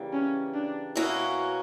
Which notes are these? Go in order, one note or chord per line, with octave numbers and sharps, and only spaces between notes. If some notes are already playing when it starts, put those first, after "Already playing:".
Already playing: C#3 E3 G3 A#3
C#4
D4
B2 A#3 C#4 E4 F#4